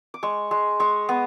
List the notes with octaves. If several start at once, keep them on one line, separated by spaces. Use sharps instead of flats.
D6
G#3 C#6
G#3
G#3 C#6
B3